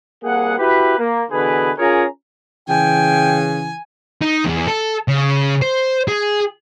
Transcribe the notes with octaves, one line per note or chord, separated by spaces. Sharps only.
C2 A#3 G#4 F#5
E4 F#4 G4 B4
A#3
B2 D3 E3 G#4 B4
C#4 F4 G#4 A#4 C#5 A#5
C#3 E3 G5 G#5
D#4
E2
A4
C#3
C5
G#4